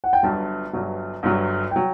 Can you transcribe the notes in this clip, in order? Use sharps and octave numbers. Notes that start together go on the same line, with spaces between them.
F#5
G5
G1 G2 F#3 A5
G1 G2 F#3
G1 G2 F#3
F#3 G5